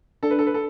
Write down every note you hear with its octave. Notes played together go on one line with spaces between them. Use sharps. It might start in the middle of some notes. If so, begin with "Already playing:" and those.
D4 A4
B4
A4
B4
A4